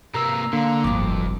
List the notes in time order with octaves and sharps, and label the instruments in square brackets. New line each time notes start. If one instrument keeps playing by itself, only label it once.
[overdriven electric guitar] C3 A#3 [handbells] A#5 E6
[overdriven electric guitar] D3 [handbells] A#3 A#5
[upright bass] D1 G1 [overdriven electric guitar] F2 [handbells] D6